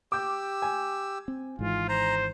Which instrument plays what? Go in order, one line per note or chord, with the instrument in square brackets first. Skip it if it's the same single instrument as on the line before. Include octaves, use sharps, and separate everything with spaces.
[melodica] G4 E6 [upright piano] D6 G6
[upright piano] G#5
[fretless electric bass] C4
[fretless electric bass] G#1 G#2 E3 [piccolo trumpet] F4
[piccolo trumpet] C5 [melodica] A#5